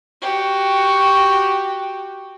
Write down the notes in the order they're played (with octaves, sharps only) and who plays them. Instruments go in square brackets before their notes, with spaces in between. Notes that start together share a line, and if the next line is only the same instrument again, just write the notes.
[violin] F#4 G4